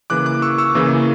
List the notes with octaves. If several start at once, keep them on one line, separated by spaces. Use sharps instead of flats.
C#3 E3 A#3 D6 F#6
D6 F#6
C#6 E6
C#6 E6
C#3 E3 A#3